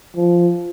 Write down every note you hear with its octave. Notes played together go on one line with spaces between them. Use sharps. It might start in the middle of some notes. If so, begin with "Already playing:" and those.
F3